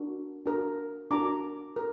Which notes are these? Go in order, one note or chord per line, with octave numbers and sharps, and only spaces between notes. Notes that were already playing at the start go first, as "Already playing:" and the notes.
Already playing: D4 F#4 A#4
D4 F#4 A#4
D4 F#4 A#4 A#5 D6
A#4